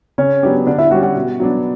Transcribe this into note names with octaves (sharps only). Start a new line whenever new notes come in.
C#3 C#4 C#5
F#3 B3 D4 G4
D3 D4 D5
E4 E5
G3 C#4 F#4 G4 F#5
F#4 F#5
B2
F#3 B3 D4